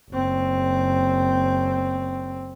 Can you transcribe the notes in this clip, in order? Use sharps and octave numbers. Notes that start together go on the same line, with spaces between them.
F#1 C4